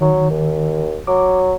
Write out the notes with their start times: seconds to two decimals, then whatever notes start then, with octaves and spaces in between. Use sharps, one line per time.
0.01 D#3 F#3
0.30 D#2
1.07 F#3 D6